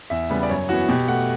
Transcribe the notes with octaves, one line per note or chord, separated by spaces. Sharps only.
E2 E5
C#3 G3 B3
D5
F#2 C#5
E3 B3 F#4
B2 G4
A3 F#5